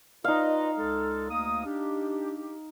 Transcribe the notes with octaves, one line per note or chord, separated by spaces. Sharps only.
D#4 F4 B4 D#5 F5
C#2 G#3 A4
D2 A#3 D#6
D4 G4